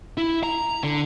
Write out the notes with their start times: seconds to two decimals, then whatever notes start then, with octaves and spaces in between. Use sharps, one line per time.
0.18 E4
0.43 A#5
0.83 D3